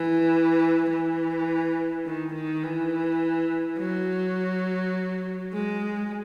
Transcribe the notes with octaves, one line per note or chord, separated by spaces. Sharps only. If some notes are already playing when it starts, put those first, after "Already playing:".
Already playing: E3
E3
D#3
D#3
E3
F#3
G#3